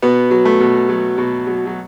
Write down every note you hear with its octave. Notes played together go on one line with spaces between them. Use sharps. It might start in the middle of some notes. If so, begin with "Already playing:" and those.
B2 B3
F#3
A3
B2
F#3
B2
F#3
F#3